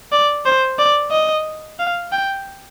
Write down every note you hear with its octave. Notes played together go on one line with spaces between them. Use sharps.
D5
C5
D5
D#5
F5
G5